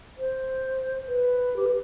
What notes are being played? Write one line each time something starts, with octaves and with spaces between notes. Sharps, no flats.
C5
B4
G4
B4